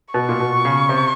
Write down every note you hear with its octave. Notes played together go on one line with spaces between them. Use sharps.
B2 C#6
A#2
B2
C#3
C3